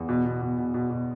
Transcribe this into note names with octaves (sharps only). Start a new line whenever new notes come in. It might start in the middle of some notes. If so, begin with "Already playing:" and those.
Already playing: E2
B2
B2
B2
B2
B2
B2